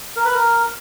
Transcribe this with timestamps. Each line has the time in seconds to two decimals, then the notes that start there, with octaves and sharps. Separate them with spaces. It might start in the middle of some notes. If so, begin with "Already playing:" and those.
0.16 A#4
0.25 B4
0.34 A#4